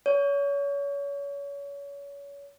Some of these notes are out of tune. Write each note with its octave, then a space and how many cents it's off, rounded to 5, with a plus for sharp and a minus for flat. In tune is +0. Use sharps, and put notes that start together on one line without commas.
C#5 +30